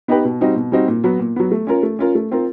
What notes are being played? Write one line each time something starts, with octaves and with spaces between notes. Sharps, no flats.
B3 D#4 G4 B4
B2
G3 C4 D#4 F#4
B2
G3 C4 D#4 F#4
A#2
F#3 B3
A#2
F#3 B3
A3
C#4 F4 A#4
A3
C#4 F4 A#4
A3
C4 F4 A#4